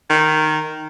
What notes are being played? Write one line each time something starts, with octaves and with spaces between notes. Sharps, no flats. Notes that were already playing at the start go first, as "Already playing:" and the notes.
D#3